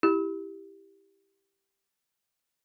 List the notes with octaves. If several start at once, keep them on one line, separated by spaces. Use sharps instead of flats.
E4 G4